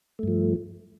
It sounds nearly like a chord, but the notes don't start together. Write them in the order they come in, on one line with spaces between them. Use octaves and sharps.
A3 G2 F3